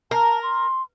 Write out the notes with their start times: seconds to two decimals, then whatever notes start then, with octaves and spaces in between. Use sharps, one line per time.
0.11 A#4 A5
0.43 C6